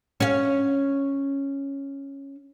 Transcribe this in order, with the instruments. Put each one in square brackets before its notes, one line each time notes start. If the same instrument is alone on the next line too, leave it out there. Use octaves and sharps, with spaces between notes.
[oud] C#4 F5